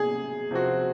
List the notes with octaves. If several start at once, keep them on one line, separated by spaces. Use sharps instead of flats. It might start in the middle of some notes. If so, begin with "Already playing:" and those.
Already playing: C3 G#4
C3 F3 C4 F#4